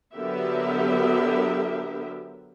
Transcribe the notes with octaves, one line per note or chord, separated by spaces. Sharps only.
D3 F#3 B3 G4 A#4 E5